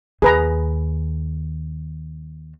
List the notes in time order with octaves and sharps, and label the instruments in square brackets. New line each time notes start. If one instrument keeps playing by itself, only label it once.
[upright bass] D#2 [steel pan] G#4 B4 A#5